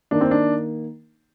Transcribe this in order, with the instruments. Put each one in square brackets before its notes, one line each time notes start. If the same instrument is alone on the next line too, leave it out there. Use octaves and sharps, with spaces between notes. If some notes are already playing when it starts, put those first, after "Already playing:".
[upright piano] D#3 A#3 D#4 [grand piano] D4
[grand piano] C4
D4